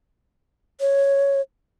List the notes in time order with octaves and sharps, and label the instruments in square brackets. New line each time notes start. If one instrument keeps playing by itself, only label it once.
[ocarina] C#5